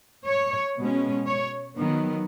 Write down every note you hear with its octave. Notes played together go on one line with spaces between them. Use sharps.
C#5
B2 G#3 C#4
C#5
D#3 F#3 B3